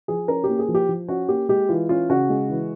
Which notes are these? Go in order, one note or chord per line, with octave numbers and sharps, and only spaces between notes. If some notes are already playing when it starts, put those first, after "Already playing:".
F3 G#4
C#4 A#4
G4
A#3
G#4
F3
G4
F3
C#4 F#4
A#3 G4
G#3 G4
E3 F4
C#4 F4
C#3 F#4
G#3
E3